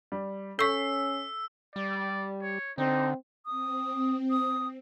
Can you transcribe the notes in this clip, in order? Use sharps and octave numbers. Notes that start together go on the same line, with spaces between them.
G3
C#4 A4 C#6 E6 B6 C7
G3 D5
C#5
D3 C4 D#4
C4 D#6
D#6